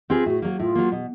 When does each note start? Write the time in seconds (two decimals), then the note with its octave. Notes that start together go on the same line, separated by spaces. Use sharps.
0.10 C4 F4 G4 G#4 B4
0.26 A2 F#4
0.42 F#3 A#3
0.59 A2 F4
0.75 F#3 A#3
0.92 B2